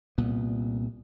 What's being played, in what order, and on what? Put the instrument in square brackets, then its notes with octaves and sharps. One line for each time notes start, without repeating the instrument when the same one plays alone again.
[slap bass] C2 A#2 B3